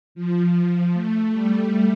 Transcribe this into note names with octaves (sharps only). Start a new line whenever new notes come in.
F3
A3
G3